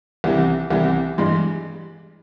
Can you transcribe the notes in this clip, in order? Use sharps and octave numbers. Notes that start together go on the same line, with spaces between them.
C2 C3 E3
C2 C3 E3
G2 E3 G#3